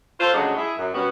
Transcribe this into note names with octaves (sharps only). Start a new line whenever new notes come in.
F4 A4 C5
D2 C#3 F#3 G#3 D4 D#5
E4 G#4
F#2
B2 G3 B3 C#4 F#4